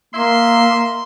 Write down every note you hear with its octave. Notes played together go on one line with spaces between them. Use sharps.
A#3 D#5 E5 C6